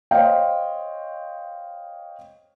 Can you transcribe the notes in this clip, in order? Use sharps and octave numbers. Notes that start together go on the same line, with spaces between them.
C5 C#5 D#5 F5 G5